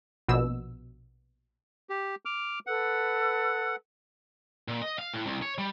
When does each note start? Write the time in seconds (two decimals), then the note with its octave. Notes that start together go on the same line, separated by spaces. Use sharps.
0.28 A#1 B2 E6
1.90 G4
2.25 D6 F6
2.67 A4 B4 F#5 E6
4.68 A#2
4.82 D#5
4.99 F5
5.14 A2
5.27 C2
5.42 C#5
5.58 G3